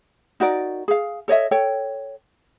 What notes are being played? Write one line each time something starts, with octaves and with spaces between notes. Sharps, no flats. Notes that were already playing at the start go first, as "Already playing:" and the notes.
D#4 F#4 A#4 D5
G#4 F5
A4 C#5 D#5 E5
A4 C#5 G5